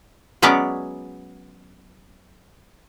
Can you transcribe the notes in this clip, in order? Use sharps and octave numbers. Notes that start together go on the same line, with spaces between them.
F#3 G#3 B3 C#4 C#5 D5